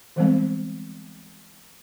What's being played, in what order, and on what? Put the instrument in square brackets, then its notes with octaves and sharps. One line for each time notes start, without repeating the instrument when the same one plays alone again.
[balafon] D3 E3 G3 G#3 B3 C4